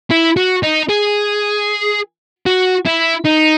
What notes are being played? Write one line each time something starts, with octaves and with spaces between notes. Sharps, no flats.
E4
F#4
D#4
G#4
F#4
E4
D#4